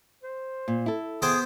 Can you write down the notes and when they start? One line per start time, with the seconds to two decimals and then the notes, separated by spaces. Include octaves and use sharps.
0.23 C5
0.68 A#2
0.86 E4 A4
1.22 B3 G#4 C5 G5